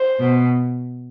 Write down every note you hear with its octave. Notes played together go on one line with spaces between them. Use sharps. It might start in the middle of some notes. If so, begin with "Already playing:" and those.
Already playing: C5
B2